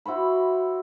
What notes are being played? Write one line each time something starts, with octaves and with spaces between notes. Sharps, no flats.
E4 F#4 C5 B5